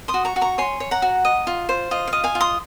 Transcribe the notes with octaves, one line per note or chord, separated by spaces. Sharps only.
C6 D#6
F#4
A#5 C#6
F#4
A#5 C#6
C#5 G#5 C6
C#5
F#5 A#5
F#4
D#5
F4
C5
F4 D#5
F5
D#5
F5 G#5
F4
C6 D#6